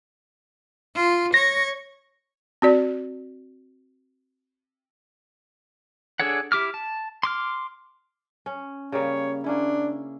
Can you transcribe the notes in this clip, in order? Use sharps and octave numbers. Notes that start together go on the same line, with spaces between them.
F4
C#5 A#6
C4 F#4 D5
D4 G#4 A4 C#5 F#5
E4 G4 D6 F6
A5
C6 D6 F6
C#4
C#3 G3 A#3 C#5
A#3 C#4 D4 E4